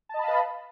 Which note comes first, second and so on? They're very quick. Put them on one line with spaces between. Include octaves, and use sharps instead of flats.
A5 D#5 B5 F5 B4